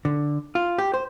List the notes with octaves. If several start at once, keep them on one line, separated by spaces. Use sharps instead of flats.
D3
F4
G4
C5